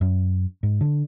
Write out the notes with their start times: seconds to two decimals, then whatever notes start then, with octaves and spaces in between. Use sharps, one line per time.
0.01 F#2
0.63 G#2
0.81 D3